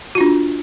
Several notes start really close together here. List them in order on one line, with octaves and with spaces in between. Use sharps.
F#4 F4 D4